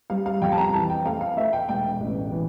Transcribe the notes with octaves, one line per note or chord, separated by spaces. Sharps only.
G3 F5
F5
F2 G5
A5
A#5
A#5
E3 A5
G5
A3 F5
F5
A3 E5
G5
E1 G5
A1
E3